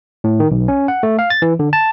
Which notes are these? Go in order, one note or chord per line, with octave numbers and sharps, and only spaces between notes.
A2
D#3
B1
C#4
F#5
A3
F5
A6
E3
D3
A5